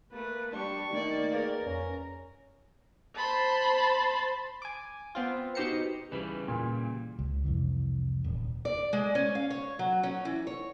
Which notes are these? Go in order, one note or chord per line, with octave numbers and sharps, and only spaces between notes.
A3 A#3 B4
G3 D4 G4 C#6
D#3 A3 A#3 D#4 D5
G#4 A#4 B4 F5
F2 C#4 A#5
C5 A5 B5 C6
G#5 D6
B3 C4 F4
B2 D#4 G4 C5 A#5 C#7
C#3 E3 G3 B4
A#2
C#2
C2 F2 E3
D#1
D5
G#3
C#4
F5
C#5
F#3
C#4
E3
C#5